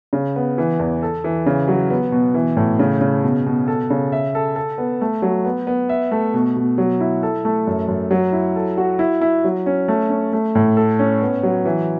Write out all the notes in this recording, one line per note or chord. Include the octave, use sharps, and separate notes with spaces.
C#3
B3
E3
E2
A4
E3
C#3
F#3
B3
B2
E3
A2
C#3
C#3
B2
B2
A4
C#3
E5
A4
A4
B3
A3
F#3
B3
B3
E5
A3
B2
B2
F#3
E4
A4
A3
F#2
F#2
F#3
E4
A4
F#4
E4
E4
F#3
C#4
A3
C#4
A3
A2
A4
C#4
B3
F#3
E3